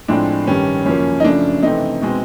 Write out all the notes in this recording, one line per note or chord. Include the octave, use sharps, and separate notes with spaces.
A2 F3 G#3 C4 D4
G2 D#3 G3 C#4
F#2 C#3 F3 A#3 C#4
D#4
F#2 C#3 F3 A3 D4
C3 E3 A3 C4 D#4
B2 G#3 C4